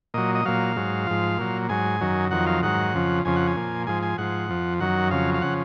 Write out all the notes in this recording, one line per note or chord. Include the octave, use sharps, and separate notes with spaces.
A#2 F#3 D#5
D#5
A#2 F#3 F5
G#2 F#3
G#2 F3
A#2 F#3
G#2 F#3 G#5
F#2 D#3 F#3
F2 D#3 F#3 F#5
F5
G#2 D#3 F#3 F#5
F2 C#3 F3
F2 C#3 F3 G#5
F#5
G#5
A#2 F3
G#2 F3 G#5
G#5
G#2 F3 F#5
F2 F3
F#2 D#3 F#3 F#5
F2 C#3 F#3 F5
F5
C#3 F3 F#5